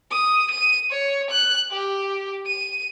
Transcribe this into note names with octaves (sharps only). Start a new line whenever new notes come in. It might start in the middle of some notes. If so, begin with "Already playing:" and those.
D#6
D#7
C#5
F#6
G4
D#7